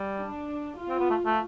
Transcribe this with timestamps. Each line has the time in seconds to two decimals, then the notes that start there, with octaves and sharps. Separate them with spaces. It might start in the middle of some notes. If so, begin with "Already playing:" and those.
Already playing: G3
0.20 D4
0.80 F4
0.89 C4
0.99 B3
1.10 A3
1.26 A3